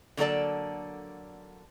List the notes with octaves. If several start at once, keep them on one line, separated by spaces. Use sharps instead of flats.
D3 F#3 A#3 A4 D5 A5